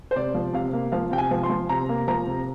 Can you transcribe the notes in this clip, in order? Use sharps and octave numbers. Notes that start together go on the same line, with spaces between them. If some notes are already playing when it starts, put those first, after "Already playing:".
C5
C3 D5
F3
C3 F5
A#3
F3 F5
C3 G5
G#5
F3
C6
F3
C3 A#5
A#3
F3 A#5
C3